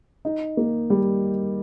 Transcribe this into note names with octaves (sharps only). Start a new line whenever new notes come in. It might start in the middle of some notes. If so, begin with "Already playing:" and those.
D#4
A#3
G3